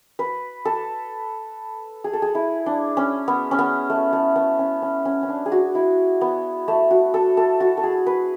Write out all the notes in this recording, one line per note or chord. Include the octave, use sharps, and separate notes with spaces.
B4
A4
G#4
A4
G#4
E4
D4
C#4
B3
C#4
B3
A3
A3
B3
C#4
C#4
C#4
C#4
D4
G#4
F#4
E4
B3
A3
F#4
A4
A4
F#4
A4
G#4
B4